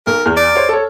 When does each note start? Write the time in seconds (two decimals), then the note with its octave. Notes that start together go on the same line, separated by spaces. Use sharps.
0.07 B1 A#4
0.26 E2 F6
0.37 D5
0.56 C5 C#5
0.69 A4 C#5